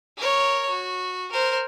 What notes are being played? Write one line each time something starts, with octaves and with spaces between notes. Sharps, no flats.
A#4 C#5
F#4
A#4 C5